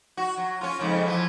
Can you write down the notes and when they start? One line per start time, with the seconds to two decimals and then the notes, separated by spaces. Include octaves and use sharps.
0.17 F#4
0.37 F#3
0.61 C#4 F4
0.79 F2 G#2 C#3
1.05 E3 F3